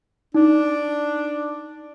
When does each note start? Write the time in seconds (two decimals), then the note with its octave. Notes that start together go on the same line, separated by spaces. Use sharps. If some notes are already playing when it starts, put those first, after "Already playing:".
0.34 D4 D#4